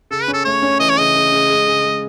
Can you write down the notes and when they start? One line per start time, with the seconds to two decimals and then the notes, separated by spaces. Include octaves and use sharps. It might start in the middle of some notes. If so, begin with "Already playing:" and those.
0.11 C#3 A4
0.23 B4
0.28 C#4
0.34 A4
0.45 A3 C#5
0.63 C#4
0.80 E3 D#5
0.90 C#5
0.98 C#3 D#5
1.15 C#3
1.32 C#3
1.50 G#3
1.67 C#3
1.84 G#3